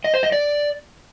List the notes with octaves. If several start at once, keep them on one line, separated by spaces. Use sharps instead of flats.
D#5
C5
D#5
D5